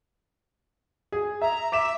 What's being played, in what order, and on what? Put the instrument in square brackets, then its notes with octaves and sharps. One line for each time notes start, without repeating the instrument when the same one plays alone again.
[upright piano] G#4
[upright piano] E5 [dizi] A#5
[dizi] E5 [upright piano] D6 B6 E7